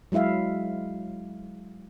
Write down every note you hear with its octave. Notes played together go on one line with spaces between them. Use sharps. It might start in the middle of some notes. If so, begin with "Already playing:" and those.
F#3 G#3 E4 E5 F5